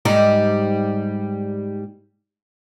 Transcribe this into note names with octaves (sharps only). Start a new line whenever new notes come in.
G#2 G3 D#4